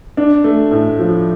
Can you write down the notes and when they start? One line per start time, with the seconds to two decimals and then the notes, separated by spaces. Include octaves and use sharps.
0.17 D4
0.44 A3
0.71 A2
0.99 F3